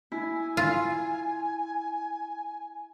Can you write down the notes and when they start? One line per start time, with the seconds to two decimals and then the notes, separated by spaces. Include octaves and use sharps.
0.12 E4 G#5
0.57 F4